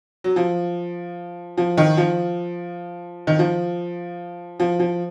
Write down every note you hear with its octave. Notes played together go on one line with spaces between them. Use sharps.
F#3
F3
F3
D#3
F3
D#3
F3
F3
F3